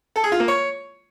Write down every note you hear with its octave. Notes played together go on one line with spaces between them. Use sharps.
A4
G#4
F4
A#3
C#5